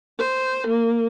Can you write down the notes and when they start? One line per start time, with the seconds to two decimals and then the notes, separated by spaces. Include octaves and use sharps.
0.19 C5
0.67 A#3